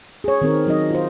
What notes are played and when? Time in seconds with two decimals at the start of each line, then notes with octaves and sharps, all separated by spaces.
0.24 G#4 C#5
0.41 D#3 C4 A#4
0.66 F#3 D#4 D#5
0.91 F4 C5